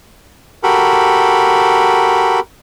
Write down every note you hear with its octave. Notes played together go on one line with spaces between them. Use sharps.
F#4 G4 A4 A#4 B5